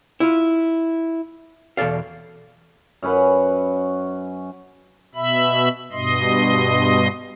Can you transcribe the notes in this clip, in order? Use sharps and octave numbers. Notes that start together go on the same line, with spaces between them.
E4 F4
E2 B2 A4 D5 F5
F#2 C#4 B4 F#5
B2 E5 B5
G2 B2 D#5 C6